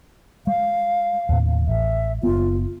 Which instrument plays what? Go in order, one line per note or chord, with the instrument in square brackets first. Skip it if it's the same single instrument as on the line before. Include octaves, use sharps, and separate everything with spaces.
[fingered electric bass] G#3 [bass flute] F5
[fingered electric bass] D#2 A2
[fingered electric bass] A1 [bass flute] E5
[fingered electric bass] F#1 B3 [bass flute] F4